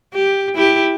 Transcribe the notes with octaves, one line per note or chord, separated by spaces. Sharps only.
G4
E4 G4